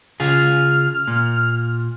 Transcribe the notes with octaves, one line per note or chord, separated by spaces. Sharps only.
C#3 F4 G#4 F6
A#2